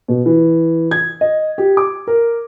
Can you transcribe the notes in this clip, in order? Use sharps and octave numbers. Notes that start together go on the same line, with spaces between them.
B2
E3
G#6
D#5
G4
D6
A#4